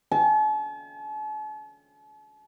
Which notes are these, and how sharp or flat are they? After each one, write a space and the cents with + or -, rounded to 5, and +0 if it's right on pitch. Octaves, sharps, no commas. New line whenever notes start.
A5 -45